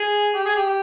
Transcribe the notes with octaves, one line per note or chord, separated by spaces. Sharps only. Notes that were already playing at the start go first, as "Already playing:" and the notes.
Already playing: G#4
G4
G#4
G4
G4